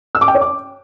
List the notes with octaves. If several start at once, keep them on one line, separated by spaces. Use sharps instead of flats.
E6
D6
G5
C#5
D6